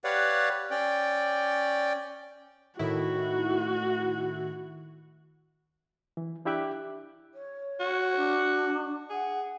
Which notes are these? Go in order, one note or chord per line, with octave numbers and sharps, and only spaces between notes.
G4 B4 C#5 D5 F5 F#5
C#4 D5 G5
A2 D#3 E4 F#4
E3
D4 E4 G4 E5 D6 F#6
C#5
F#4
D4
G#4 F#5